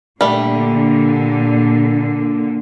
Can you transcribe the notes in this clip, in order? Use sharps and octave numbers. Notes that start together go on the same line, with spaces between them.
A#2 D3 G3 A3